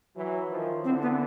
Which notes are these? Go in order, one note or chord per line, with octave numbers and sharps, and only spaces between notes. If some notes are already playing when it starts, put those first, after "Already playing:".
E3 F#3
D#3 F3
D3 E3 C4
B3